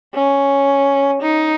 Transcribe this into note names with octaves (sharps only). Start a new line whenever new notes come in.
C#4
D#4